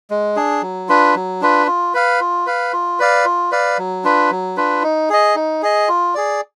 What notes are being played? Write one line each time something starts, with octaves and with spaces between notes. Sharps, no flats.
G#3
D4 G#4
F#3
D4 F4 B4
F#3
D4 F4 B4
F4
B4 F5
F4
B4 F5
F4
B4 D5 F5
F4
B4 D5 F5
F#3
D4 F4 B4
F#3
D4 F4 B4
D#4
G#4 D#5
D#4
G#4 D#5
F4
G#4 D5